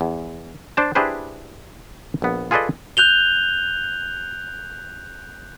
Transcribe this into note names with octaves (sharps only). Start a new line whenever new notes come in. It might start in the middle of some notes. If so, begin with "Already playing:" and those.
E2
D4 C5 A5
D4 E4 G4 G#4 B4 C5
A#1 B3
F4 G#4 A4 B4 D5 D#5
F#6 G6 F7 G7